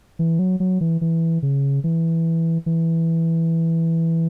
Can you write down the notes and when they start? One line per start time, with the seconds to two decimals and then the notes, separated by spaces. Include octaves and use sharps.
0.19 E3
0.39 F#3
0.60 F#3
0.81 E3
1.01 E3
1.42 C#3
1.84 E3
2.66 E3